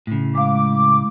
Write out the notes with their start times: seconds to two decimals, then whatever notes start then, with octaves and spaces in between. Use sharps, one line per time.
0.07 A2 C#3
0.35 G#3 F5 D6